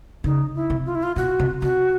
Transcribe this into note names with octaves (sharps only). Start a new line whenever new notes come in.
C#3 D#4
E4
C3
F4
E4
F4
B2 F#4
C3
C3 F#4